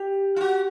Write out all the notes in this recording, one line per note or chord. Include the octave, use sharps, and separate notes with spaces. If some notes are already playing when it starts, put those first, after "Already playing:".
Already playing: G4
F4
F#4